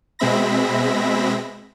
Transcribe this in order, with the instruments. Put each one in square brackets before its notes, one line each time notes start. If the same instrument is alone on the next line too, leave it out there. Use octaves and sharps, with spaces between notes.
[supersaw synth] B2 G#3 C4 E5 B5 A#6